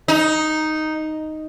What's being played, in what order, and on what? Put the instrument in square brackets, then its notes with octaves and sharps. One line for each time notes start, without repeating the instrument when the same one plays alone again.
[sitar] D#4